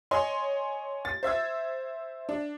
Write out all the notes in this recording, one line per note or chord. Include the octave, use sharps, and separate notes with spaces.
C#5 D#5 G#5 C6
A6
C5 E5 E6 G#6
D4